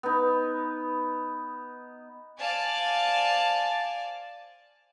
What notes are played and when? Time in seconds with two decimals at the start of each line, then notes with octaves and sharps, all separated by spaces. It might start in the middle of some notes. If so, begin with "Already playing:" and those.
0.03 B3 D#4
2.40 C5 D5 F5 G#5 A5